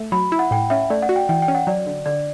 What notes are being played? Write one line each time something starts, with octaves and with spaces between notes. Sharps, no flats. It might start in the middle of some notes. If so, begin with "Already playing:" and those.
Already playing: A3
F#3 B5
E4
F#5
A2 G5
C#4 E5
A3 D5
F#5
F#4
G5
E3 G5
G5
C#4
F#5
F#3 D5
D3
D3 D5